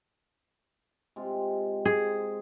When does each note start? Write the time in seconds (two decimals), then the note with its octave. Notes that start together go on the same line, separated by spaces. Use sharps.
1.16 C3 G#3 F4
1.86 G#4